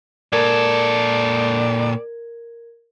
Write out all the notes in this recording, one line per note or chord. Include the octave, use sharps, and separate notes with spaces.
A#2 A4 A#4 D5 G#6